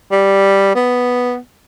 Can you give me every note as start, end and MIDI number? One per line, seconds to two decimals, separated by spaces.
0.11 0.74 55
0.75 1.37 59